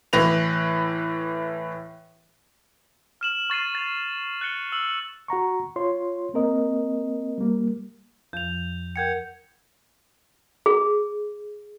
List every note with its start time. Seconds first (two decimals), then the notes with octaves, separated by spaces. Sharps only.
0.13 A2 E3 B4 A#6 F7
3.21 F6 E7 F#7
3.50 C#6 A6 C7 D#7
3.75 A6 F7
4.41 F#6 A6 C#7 G7
4.72 E6 F#7
5.28 F#4 F#5 A#5 C#6
5.76 F4 C#5 C6
6.34 A#3 C4 A#4 D#5
7.38 G3 A#3
8.33 F2 F3 G6 F7
8.96 A#4 F#5 G5 G6 G#6 C#7
10.66 G#4